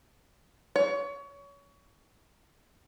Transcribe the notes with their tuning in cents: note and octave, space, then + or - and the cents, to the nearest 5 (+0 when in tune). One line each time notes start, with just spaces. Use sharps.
C#5 +25